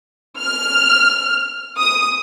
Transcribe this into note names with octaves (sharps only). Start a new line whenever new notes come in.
F6
D#6